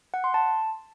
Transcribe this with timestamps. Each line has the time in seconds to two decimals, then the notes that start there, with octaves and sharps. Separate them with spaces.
0.14 F#5
0.24 C6
0.34 A5